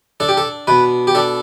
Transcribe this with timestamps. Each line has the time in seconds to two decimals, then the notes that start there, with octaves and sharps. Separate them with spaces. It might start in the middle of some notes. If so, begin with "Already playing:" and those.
0.20 D4 A4
0.29 G4
0.37 A4
0.67 B2 B4
1.07 G4
1.15 D4 A4